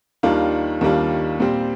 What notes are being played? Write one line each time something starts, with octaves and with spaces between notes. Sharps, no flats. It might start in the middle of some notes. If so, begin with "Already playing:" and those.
D#2 D#3 G3 D4 F4
D#2 D#3 G3 D4 F4
A#2 G3 C4 G4